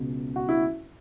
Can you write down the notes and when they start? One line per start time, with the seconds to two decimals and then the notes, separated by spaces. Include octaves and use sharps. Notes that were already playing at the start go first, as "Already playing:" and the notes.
Already playing: C#2 B2
0.36 F#4
0.49 E4